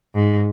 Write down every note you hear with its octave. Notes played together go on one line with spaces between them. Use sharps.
G#2